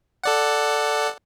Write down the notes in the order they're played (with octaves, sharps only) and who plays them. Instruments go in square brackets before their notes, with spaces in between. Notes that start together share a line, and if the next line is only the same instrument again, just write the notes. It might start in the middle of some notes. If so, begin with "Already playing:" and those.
[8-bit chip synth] A4 D5 F#5